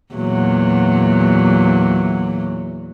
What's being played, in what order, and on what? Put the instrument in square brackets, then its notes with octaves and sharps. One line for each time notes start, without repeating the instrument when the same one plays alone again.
[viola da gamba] E2 A#2 F#3